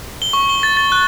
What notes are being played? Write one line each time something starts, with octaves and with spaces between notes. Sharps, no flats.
G7
C#6
G7
A6
A6
F#6